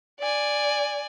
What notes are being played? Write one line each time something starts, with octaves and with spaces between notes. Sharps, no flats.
D5 G#5